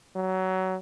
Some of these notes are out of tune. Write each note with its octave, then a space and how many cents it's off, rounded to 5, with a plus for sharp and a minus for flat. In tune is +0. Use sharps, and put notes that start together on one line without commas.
F#3 +20